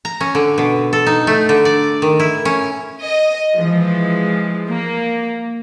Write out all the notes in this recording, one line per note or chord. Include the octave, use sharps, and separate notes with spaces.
A#5
C#4
D3
B2
A4
D#4
A3
D3
D5
D#3
E4
C#4
D#5
E3 F3 G#3
A#3